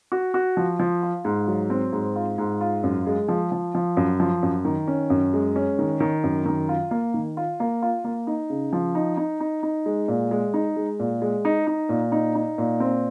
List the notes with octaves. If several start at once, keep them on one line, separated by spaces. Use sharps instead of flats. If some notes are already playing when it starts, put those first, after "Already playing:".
F#4
F#4
F3
F3
F4
G#2
F#3
C4
G#2
F4
G#2
F4
F#2
G#3
F3
F3
F3
F#2
F3
F#2
D#3
C#4
F#2
G#3
C#4
D#3
D#3
F#2
D#3
F4
A#3
D#3
F4
A#3
F4
A#3
D#4
C#3
F3
D#4
D#4
D#4
D#4
G#3
A#2
G#3
D#4
G#3
A#2
G#3
D#4
D#4
A#2
D#4
D#4
A#2
C4